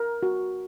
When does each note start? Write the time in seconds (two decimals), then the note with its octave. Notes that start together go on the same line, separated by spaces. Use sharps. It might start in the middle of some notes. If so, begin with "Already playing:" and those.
Already playing: A#4
0.23 F#4